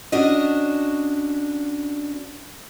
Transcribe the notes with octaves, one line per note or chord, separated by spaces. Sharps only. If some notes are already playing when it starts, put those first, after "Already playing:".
C#4 D4 F#4 D#5